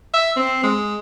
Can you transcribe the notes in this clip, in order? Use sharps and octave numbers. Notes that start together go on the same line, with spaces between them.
E5
C4
G#3